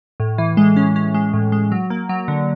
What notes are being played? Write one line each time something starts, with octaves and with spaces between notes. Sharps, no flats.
A2
E3
G#3
C#4
C#4
G#3
A2
G#3
F#3
A#3
F#3
D3